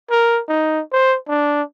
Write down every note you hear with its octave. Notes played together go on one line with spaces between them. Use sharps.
A#4
D#4
C5
D4